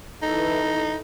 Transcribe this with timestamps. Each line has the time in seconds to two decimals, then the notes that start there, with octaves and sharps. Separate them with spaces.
0.22 E3 D#4 A4